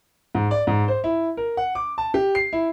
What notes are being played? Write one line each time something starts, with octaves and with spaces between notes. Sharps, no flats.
G#2
D5
G#2
C5
E4
A#4
F#5
D6
A5
G4
C7
E4